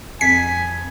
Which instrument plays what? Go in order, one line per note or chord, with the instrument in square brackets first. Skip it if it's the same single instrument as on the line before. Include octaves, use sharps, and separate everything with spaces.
[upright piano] F2 [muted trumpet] G#5 [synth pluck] B6